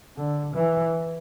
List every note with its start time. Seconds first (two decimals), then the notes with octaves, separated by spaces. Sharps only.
0.17 D3
0.54 E3